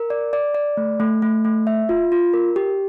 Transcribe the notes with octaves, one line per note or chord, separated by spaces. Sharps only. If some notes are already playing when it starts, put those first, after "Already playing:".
Already playing: A#4
D5
D5
D5
A3
A3
A3
A3
E5
F4
F4
A#4
G4